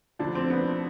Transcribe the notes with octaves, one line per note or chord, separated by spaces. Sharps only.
D2 D3 F3 D4
C4
B3